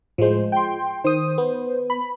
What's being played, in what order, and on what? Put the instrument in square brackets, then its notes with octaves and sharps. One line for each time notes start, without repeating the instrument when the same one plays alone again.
[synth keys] A2 C5 [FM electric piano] F3 G#3
[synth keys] G5 C6
[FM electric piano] D#3 D#6 [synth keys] C5
[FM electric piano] B3
[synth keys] B5